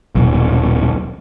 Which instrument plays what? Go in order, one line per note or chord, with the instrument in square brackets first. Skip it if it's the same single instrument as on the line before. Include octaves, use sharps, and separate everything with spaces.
[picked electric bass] D#1 B1